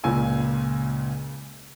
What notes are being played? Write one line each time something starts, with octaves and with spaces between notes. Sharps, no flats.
C#2 A#2 C#3 F4 G#5 E6